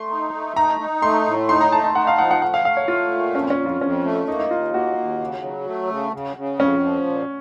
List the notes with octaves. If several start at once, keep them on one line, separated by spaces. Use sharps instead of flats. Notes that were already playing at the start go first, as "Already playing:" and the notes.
Already playing: A3 C6
D#4
A3
D#4 A#5
D#4
A3 C6
A2
D#4 C6
A#5
A3 A5
A5
D#4 F#5
F5
F3 F#5
F#5
A3 F#5
F5
A3 F5
C#5
A3 F4
A#2
F2 C#4
C#4
F2
F4
F2 C#4
A3
A#3 D#4
D#4
D#2 F4
A#3 F#4
D#2
C#3
F#3
A3
C#3
C#3
C#3
F2 C#4
F3
A#2